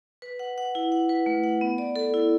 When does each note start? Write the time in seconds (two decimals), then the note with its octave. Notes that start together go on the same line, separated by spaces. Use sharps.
0.22 B4
0.39 F#5
0.58 F#5
0.75 E4
0.92 F#5
1.09 B4
1.26 A3
1.44 F#5
1.61 B3
1.78 D5
1.96 A4
2.14 E4